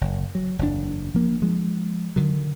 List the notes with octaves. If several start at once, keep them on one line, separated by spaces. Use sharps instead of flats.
F#1
F#3
F#1 E2 C#3 D4
F3 A#3
F3 G#3
D3 D#3 F#3